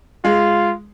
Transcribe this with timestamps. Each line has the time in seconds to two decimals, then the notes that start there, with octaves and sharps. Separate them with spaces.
0.25 G#3 F4